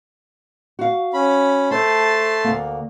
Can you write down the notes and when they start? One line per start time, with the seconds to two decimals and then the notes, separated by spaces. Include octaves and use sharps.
0.79 F#4 F5
1.14 C#4 B5
1.71 A3 C5 A5 C6
2.44 D2 A#3